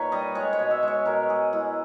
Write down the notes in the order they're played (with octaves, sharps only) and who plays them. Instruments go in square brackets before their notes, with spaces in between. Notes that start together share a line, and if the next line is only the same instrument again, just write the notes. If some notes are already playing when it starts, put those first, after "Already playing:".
Already playing: [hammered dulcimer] A#2 D#4 B4 C#5
G3 D#5
G#3 C#5
C#5
B2
E5
G#3 C#5
B2 A#4
G#3 G#4
G#3 E4